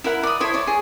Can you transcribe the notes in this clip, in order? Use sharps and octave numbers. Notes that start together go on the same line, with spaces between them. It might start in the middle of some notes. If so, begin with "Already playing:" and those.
E4 A#4 F#5
D5 D#6
E4 A4 C5 C#5
C#5 D5
G#4